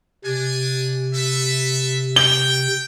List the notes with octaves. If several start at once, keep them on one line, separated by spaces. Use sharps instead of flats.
C3 D4 G#5
A4 B4 E5
G5 G7